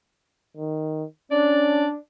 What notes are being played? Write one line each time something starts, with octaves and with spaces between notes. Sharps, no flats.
D#3
C#4 D4 D5